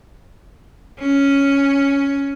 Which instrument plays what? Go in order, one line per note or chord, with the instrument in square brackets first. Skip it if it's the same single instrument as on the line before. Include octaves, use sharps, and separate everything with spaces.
[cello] C#4